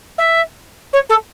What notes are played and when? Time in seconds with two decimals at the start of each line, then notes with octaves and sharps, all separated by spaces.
0.18 E5
0.93 C#5
1.09 A4